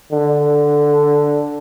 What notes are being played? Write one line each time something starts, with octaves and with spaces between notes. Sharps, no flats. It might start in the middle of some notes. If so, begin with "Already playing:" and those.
D3